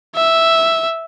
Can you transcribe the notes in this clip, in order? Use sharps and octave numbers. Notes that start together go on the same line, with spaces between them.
E5